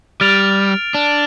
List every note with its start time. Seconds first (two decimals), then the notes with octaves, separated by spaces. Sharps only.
0.21 G3 F6 A6 D7 F7
0.95 D4